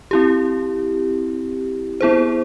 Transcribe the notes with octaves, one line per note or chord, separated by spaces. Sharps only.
C4 E4 G4
B3 E4 G#4 C5